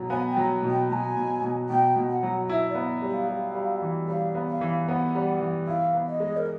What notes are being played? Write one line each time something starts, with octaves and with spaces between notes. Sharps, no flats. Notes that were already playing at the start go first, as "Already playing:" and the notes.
Already playing: B2 F#3
B3 G#5
G5
F#3
B2
G5
B2 G#5 A#5
B2
B2
B2 G5
B2
F#5
F#3
E4 E5
D5
B3
G3
F5
G3
G3
E3
G3 F5
B3
F5
E3
B3 F#5
G3
E3
E4 F5
B3
D#5
G#3
A#4